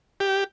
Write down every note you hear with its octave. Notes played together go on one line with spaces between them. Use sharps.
G4